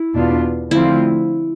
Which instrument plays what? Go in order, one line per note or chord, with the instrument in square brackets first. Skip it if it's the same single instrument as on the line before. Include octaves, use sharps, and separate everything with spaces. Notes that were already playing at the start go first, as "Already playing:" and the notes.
Already playing: [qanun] E4
[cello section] E2 B2 B3 D4 F4
[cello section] D3 F3 A3 C4 F4 [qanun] E4